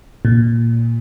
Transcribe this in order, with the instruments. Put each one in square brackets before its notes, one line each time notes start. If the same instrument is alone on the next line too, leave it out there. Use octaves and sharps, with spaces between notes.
[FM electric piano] A#2